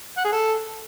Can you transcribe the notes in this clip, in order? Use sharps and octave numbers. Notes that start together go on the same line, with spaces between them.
F#5
G#4
A4